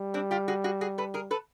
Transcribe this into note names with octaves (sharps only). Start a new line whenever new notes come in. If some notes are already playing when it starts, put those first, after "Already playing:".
Already playing: G3
C4 D4
F4 G4
F#4 G#4
F#4 G#4
F#4 G#4
A4 B4
G#4 A#4
A4 B4